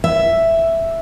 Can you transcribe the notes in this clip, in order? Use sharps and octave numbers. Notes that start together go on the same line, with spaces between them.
E5